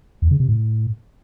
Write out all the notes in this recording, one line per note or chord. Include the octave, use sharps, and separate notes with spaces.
E2
C#3
C3
A2